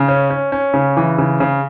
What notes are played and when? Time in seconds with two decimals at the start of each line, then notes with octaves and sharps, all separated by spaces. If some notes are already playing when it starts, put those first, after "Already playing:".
Already playing: C#3
0.08 C#4
0.30 C#4
0.52 C#4
0.74 C#3
0.97 E3
1.18 C#3
1.40 C#3